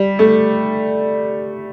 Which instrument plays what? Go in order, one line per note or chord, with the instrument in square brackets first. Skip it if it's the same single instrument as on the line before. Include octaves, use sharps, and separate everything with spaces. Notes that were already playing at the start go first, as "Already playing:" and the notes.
Already playing: [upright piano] G3
A3